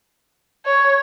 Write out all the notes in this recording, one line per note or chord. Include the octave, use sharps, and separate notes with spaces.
C#5